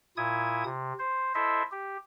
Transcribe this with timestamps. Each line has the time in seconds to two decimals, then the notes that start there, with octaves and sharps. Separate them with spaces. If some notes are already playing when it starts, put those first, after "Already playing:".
0.17 A#2 E4 D#6 G#6
0.65 C3
0.99 C5
1.35 E4 A4 C5 D#5 E5
1.72 G4